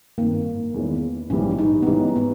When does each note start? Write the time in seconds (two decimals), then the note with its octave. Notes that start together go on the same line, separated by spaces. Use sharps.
0.18 G#1 G2 D#3 A#3
0.74 E2 D#3 G#3 C#4 E4
1.30 A#1 G#2 E3 G3 C#4
1.59 D#4
1.82 B3
1.87 G#2 E3 G3 C#4
2.16 B3